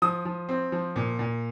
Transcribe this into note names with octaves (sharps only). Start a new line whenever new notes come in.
F3 D#6
F3
C4
F3
A#2
A#2